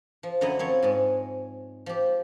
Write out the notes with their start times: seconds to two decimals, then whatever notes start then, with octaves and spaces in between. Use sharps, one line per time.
0.23 F3
0.41 F#2 D3 F#3 E4 D#5 A#5
0.59 F3 C4 C#5
0.82 G#2 G#3
1.86 F3 G4